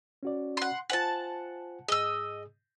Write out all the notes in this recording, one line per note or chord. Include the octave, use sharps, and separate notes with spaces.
C#4 F#4 D5
F#5 C6
F4 C5 F#5 G#5 A5
G#2 G#4 D#5 E6